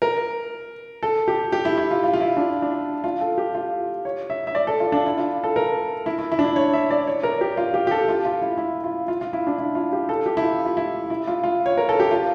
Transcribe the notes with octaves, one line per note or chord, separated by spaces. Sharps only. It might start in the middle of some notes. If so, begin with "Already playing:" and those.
A#4
A4
G4
G4
E4
E4
F4
F4
F4
E4
D4
D4
F4
A4
G4
F4
C#5
E5
E5
D5
A4
F4
D4
E4
F4
A4
A#4
E4
E4
E4
D4
E4
C#5
E5
D5
C#5
A#4
G4
F4
G4
G4
A4
F4
F4
E4
E4
F4
F4
F4
E4
D4
E4
F4
G4
A4
G4
E4
F4
F4
E4
E4
F4
F4
C#5
A#4
A4
G4
F4